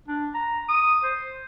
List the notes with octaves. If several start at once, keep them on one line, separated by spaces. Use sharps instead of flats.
D4
A#5
D#6
C5